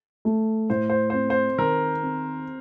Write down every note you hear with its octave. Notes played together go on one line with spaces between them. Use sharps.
A3
A2 C5
C5
C4 C5
C5
D#3 A#4
C4